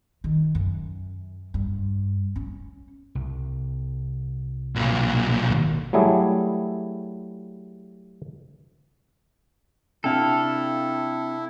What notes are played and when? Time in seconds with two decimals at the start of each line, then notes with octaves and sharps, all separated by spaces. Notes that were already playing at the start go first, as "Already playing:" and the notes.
0.24 D#3
0.55 F#2
1.54 G2
2.36 C#4
3.15 C2
4.76 B1 A#2
5.49 G#1 D#3
5.93 F#3 G3 A3 E4 G#4
10.04 C3 D4 E4 A4 F5 G5